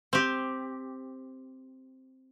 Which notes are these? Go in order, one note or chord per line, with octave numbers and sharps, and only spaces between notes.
C4 G4